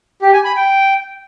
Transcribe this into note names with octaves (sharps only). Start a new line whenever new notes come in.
G4
G#5
B5
G5